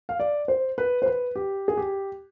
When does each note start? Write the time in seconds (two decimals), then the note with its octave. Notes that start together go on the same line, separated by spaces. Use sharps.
0.09 F5
0.20 D5
0.48 C5
0.78 B4
1.02 C5
1.06 B4
1.36 G4
1.68 G#4
1.77 G4